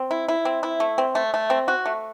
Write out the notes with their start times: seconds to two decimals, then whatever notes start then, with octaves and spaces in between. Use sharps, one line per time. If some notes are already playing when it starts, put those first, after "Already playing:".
Already playing: C4
0.11 E4
0.28 E4
0.45 C4
0.63 E4
0.80 A3
0.98 C4
1.15 A3
1.34 A3
1.50 C4
1.68 F#4
1.86 A3